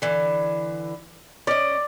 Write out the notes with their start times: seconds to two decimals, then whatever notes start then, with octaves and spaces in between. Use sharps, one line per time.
0.02 D3 E3
1.47 C#4 D5 D#5